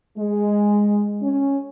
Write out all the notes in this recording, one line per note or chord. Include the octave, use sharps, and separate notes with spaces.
G#3
C#4